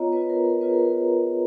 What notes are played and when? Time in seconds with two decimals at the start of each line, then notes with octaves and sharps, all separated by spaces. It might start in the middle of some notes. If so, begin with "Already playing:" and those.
Already playing: B3 F4 C#5 D#5 A#5
0.12 B3 F4 B4
0.30 A#4
0.45 A#4
0.61 B3 F4 B4
0.68 G#4
0.73 A#4
0.85 A#4